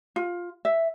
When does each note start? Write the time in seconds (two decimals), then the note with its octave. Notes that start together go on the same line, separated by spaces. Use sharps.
0.16 F4
0.65 E5